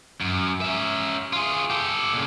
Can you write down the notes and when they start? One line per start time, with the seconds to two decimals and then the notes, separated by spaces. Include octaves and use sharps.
0.21 F#2
0.61 C#4 E5
1.33 F4 G#4
1.70 G4 A4
2.13 A#2 C#3